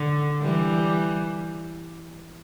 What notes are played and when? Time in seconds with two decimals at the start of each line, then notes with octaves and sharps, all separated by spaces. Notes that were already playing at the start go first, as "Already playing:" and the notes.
Already playing: D3
0.42 E3 G3